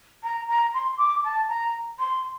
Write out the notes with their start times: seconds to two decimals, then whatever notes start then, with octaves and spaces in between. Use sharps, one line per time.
0.23 A#5
0.48 A#5
0.73 C6
0.97 D6
1.24 A5
1.48 A#5
1.99 C6